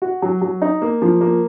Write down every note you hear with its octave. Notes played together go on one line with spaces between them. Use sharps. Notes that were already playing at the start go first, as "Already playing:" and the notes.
F#4
F#3
F#3
D#4
A#3
F3
A#3